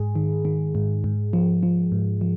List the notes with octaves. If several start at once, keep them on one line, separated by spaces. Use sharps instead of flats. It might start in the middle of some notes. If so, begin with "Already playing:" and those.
Already playing: G#2 G#4
D#3
D#3
G#2
G#2
F3
F3
G#2
F3